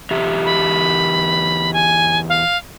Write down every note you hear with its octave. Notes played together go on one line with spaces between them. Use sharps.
E2 G4 E5
B5
G#5
F5